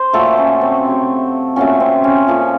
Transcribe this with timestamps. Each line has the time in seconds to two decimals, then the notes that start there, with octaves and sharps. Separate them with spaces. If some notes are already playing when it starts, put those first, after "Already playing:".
Already playing: C5
0.13 A#2 F#3 A3 A4
0.37 C#4
0.61 C4
0.85 C3 F#3 A3
1.56 A#2 F#3 A3 C#4
1.80 C4
2.04 C#4
2.28 A#2 F3 A3